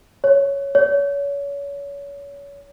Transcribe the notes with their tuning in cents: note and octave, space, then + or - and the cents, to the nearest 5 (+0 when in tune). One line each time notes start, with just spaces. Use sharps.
C#5 +5
C#5 +30